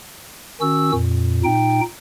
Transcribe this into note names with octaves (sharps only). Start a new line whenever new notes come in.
D#3 C#4 F#4 E6
F2 A#2
A#2 D#4 G5